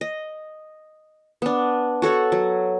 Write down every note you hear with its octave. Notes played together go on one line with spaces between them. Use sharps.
D#5
B3 D4
F#4 A4 C#5 F#5
F#3